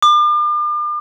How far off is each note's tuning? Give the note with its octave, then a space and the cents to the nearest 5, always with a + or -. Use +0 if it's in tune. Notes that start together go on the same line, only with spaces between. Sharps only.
D6 +40